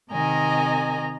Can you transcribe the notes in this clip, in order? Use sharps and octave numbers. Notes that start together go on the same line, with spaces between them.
C3 D#3 D#5 G#5 A#5